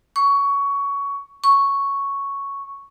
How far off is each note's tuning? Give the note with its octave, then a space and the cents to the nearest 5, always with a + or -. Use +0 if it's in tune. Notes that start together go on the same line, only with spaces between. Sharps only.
C#6 +15
C#6 +0